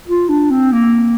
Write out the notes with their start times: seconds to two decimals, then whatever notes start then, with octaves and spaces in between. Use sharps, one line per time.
0.07 F4
0.29 D4
0.51 C4
0.72 A#3